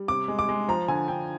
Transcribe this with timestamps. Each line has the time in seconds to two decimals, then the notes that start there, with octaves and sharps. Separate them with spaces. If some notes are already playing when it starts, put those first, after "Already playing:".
Already playing: G3
0.08 C3 D6
0.28 G#3
0.39 D6
0.49 G#3
0.68 F3 A#5
0.88 D3 G#5
1.08 D3 G5